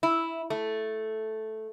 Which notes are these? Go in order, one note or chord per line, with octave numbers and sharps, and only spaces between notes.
E4
A3